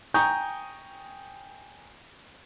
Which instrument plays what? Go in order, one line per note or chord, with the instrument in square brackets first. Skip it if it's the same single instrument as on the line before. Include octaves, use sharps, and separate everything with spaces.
[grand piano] G5 G#5 A#5 C#6 D#6 G6